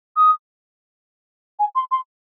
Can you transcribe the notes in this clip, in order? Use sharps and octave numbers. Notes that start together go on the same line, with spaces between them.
D#6
G#5
C6
C6